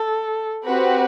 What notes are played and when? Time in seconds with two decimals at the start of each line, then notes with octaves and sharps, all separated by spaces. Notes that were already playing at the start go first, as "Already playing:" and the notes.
Already playing: A4
0.65 C4 F#4 G4 B4